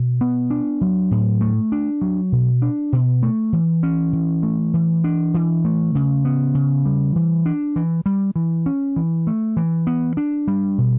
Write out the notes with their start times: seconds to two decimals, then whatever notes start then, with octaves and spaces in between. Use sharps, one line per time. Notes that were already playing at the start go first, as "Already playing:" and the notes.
Already playing: B2
0.21 B3
0.50 D4
0.81 F#3
1.11 A2
1.41 A3
1.72 D4
2.01 F#3
2.32 B2
2.62 D4
2.93 B2
3.23 A3
3.53 E3
3.83 C#4
4.13 E3
4.43 A3
4.74 E3
5.04 D4
5.34 E3
5.65 A3
5.95 C#3
6.25 B3
6.54 C#3
6.85 G3
7.16 E3
7.46 D4
7.76 E3
8.06 G3
8.36 E3
8.66 C#4
8.96 E3
9.27 A3
9.57 E3
9.87 B3
10.17 D4
10.48 G3
10.78 B2